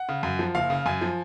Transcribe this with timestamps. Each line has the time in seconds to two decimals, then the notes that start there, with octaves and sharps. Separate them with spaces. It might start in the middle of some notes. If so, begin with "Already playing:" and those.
Already playing: F#5
0.09 C#3
0.23 F#2
0.39 F3
0.55 F#1 F5
0.70 C#3
0.86 F#2 G#5
1.01 F3